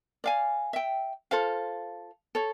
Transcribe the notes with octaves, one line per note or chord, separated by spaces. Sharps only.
D5 F5 G#5
E5 G5
F4 A4 C5 F5
A4 C#5